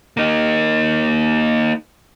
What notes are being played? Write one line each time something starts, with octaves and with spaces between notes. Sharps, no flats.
A#3 D#4